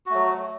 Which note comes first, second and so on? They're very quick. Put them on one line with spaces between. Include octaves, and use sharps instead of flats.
F#4 A3 F#3